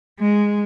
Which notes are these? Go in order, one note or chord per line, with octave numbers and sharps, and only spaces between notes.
G#3